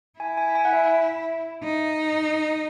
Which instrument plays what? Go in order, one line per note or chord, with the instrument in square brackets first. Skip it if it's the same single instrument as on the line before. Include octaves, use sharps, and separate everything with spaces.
[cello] E4 [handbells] G#5
[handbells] G#5
G#5
F#5
E5
[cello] D#4